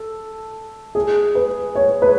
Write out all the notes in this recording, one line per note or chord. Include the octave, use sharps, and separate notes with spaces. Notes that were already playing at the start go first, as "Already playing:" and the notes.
Already playing: A4
G#4
B4
C#5
B4